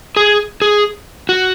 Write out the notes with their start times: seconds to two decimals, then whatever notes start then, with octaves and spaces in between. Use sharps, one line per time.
0.16 G#4
0.62 G#4
1.29 F#4